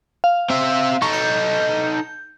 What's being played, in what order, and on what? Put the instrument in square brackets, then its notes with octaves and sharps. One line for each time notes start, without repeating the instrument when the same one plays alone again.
[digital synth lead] F5
[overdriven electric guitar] C4 E5
[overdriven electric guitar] D#4 A4 [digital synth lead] C#6
[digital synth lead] G6